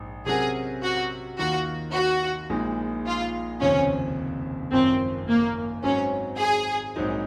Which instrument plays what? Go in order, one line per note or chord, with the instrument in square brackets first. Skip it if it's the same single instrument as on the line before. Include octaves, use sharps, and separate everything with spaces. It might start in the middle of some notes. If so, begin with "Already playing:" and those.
Already playing: [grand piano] A#1 G#2
[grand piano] C3 F#3 C#4 F#4 A#4 [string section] G#4
[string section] F#4
[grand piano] D#2 D#3 A#3 F4 A#4 [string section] F#4
[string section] F#4
[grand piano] A#1 A#2 G#3 D#4
[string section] F4
[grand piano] F1 D#2 C#3 F3 C4 [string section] C#4
[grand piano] G#1 F#2 F3 [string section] C4
[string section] A#3
[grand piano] G#2 F#3 C4 [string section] C#4
[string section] G#4
[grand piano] A#1 G#2 F#3 C4 D#4